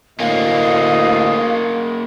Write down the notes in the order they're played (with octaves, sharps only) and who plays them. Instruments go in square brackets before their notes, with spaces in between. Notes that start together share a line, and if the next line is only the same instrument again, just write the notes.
[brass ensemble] D2 A2 D#5 [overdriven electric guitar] A#3 C#4 [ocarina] F5